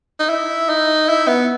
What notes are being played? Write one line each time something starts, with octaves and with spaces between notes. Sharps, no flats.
D#4
E4
D#4
E4
B3